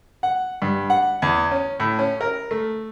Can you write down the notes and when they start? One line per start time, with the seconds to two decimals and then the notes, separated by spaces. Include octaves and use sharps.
0.23 F#5
0.62 G2
0.90 F#5
1.22 E2
1.51 C#4
1.80 A2
1.99 C#4
2.21 A#4
2.51 A3